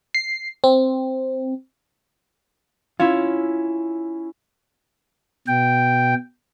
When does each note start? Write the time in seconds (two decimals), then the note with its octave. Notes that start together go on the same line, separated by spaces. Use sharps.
0.14 C7
0.64 C4
3.00 C#4 E4 F4
5.48 B2 G5